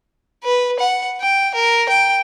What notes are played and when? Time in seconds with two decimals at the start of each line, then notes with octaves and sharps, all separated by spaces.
0.44 B4
0.79 F#5
1.21 G5
1.55 A#4
1.89 G5